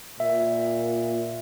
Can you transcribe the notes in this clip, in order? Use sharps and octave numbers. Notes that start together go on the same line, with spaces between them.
A#2 E5